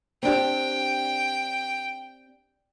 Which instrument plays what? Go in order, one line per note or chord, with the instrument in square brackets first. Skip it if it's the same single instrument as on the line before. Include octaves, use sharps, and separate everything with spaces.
[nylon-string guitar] C4 D4 G4 [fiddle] G5